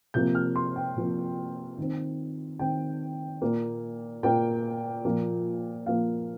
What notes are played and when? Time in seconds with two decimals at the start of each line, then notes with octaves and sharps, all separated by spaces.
0.14 C3 F3 A#3 G6
0.35 F6
0.56 C6
0.76 G5
0.96 C3 F3 A#3
1.78 D#3 C4
2.59 D#3 C4 G5
3.42 A#2 A#3
4.23 A#2 A#3 G5
5.05 A#2 F3 A#3
5.86 A#2 F3 A#3 F5